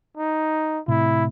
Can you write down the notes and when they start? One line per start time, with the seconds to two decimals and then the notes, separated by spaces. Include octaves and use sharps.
0.17 D#4
0.88 A2 C3 E4